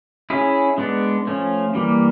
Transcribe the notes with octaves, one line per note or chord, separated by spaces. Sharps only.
C#4 E4 G#4
G#3 B3 D4
F3 A3 C#4
E3 G3 A#3